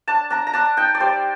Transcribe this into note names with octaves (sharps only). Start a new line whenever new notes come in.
D4 A5
D4 A#5
A#5
D4 A5
D#4 G5
D5
G3 C5